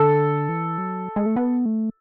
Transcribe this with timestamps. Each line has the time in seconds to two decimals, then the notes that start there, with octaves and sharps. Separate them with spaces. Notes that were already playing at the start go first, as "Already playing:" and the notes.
Already playing: D3 A4
0.49 E3
0.78 F#3
1.16 G#3
1.26 A3
1.36 B3
1.65 A3